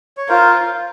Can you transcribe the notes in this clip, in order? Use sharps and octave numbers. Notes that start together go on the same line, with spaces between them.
C#5
F4 A#4 C5